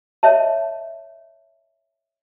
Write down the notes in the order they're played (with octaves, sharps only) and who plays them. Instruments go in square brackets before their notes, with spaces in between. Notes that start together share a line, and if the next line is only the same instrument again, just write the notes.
[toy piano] C#5 D#5 E5 A5